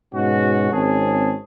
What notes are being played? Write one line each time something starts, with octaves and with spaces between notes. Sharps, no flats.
G#2 B2 C#4 F#4
G#1 C4 C#4 G#4 A5